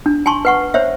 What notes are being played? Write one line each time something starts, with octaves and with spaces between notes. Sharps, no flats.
D4
G#5 A5 C6 C#6
B4 F#5 C#6
C5 C#5 E5